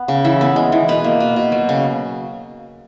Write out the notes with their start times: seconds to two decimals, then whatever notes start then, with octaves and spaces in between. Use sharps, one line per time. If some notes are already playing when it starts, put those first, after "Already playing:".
Already playing: B3
0.08 C#3
0.25 E3 E5
0.41 B3
0.56 G#3
0.72 E3
0.88 B2 B4
1.04 A#3
1.20 B2
1.36 B2
1.52 F#3
1.69 C#3